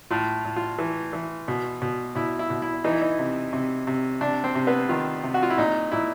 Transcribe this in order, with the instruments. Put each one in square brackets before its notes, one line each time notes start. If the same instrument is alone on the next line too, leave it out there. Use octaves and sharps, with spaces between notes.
[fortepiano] A2 F4
A2
F4
E3
E3
B2
B2
B2 E4
E4
B2
E4
E3 D#4
E4
D#4
C3
C3
C3
C3 D4
C4
C3
B3
D#3 F4
C3
F#4
F4
E4
A#2 D#4
A#2 E4